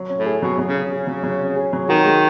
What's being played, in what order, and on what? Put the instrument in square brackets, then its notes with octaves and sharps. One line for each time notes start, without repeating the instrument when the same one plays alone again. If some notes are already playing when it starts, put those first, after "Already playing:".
Already playing: [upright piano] F#3
C#4
[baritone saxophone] A2
[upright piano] G#4
[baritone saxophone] B2 [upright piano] F#3
[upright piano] F#3
[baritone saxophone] C#3
[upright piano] C#4
[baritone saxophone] C#3 [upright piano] G#4
[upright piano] F#3
F#3
C#4
G#4
F#3
[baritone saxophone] D#3 [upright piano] F#4
[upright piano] G#3